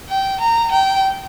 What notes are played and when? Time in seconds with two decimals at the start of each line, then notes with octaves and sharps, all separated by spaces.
0.09 G5
0.41 A#5
0.72 G5